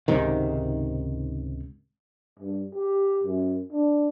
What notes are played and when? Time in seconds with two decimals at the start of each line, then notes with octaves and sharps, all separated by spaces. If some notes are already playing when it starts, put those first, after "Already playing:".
0.08 C#2 G#2 C3 D#3
2.39 G2
2.75 G4
3.24 F#2
3.72 D4